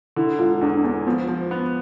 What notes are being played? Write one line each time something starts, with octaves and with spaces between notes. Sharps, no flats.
D3 E4
E1 F4
E2 D4
E2 B3
F3 B3
F3
B3